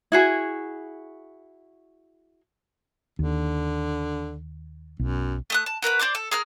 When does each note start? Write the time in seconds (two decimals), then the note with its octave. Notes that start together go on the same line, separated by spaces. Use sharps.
0.12 E4 F#4 G#4
3.19 D#2 D3
4.99 B1 F#2
5.50 A3 D#6 F#6
5.66 A5
5.82 F#4 A#4 B4 B5
6.00 C5 D5 C6 D6
6.15 A4
6.31 G#4 A#4 F6